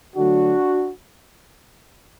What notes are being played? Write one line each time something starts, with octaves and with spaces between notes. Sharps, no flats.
D3 F#3 A3 D4 F#4